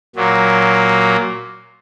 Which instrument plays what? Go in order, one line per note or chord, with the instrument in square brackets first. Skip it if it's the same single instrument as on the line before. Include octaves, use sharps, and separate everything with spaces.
[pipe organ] A#2 F#3 A#3